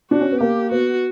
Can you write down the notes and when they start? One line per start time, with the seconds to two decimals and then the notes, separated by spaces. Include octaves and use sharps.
0.11 D4 F#4
0.21 C#4
0.32 B3
0.40 A#3 G4
0.71 B3 F#4